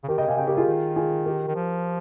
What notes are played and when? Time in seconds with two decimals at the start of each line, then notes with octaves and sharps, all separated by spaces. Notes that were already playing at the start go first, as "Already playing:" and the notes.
0.04 C#3
0.08 D#3 G4 A#4
0.18 C#3 D#5 G5
0.28 C3 F5 G#5
0.37 C#3 D#5 G5
0.47 G4 A#4
0.57 F4 G#4
0.66 D#3
0.96 F4 G#4
1.26 G4 A#4
1.48 D#3
1.55 F3